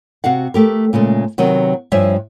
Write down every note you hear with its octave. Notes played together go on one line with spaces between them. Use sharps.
C3 F#4 F5 F#5
A3 G4 A#4
A#2 C#3 G#3 A3
C3 D#3 F#3 B3
G2 F3 C#5 E5 G#5